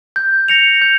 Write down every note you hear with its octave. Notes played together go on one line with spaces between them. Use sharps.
G6
A#6 C#7 F7
G6